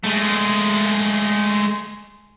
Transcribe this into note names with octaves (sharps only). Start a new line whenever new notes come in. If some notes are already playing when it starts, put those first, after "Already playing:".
G#3 A3